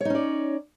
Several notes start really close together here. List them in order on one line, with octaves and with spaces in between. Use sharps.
C#5 D#4 C#4 D5